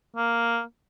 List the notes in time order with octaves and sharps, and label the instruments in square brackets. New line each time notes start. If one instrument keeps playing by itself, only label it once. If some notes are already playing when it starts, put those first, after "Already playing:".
[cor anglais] A#3